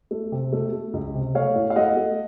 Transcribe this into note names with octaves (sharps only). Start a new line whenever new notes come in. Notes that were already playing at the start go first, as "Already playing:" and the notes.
A3
C3
A3
A3
C#2
C3
A3 C#5 F5
A2
F5
A3 D#5 F#5
A3